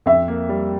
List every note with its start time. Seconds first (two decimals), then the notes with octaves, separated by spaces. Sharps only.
0.06 F2 E5
0.28 A#3
0.49 G3